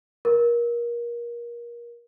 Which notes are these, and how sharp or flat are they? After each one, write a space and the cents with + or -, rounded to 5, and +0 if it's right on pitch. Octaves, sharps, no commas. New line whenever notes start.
A#4 +25